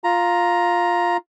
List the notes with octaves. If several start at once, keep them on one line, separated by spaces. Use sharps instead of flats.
F4 A#5